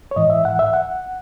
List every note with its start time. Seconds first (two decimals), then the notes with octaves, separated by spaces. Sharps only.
0.11 C#5
0.16 G#2 E3 D#5
0.30 E5
0.45 F#5
0.59 E5
0.74 F#5